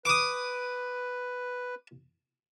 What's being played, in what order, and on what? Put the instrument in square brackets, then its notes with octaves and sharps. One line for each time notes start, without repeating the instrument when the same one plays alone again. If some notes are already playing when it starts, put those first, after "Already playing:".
[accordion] B4 [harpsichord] D6 D#6